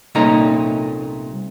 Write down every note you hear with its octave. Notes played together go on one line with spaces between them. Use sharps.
C2 A#2 A3 C#4 D#4 A#5